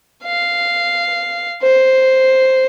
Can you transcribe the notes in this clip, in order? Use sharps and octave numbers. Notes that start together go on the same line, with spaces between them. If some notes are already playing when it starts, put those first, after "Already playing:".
F5
C5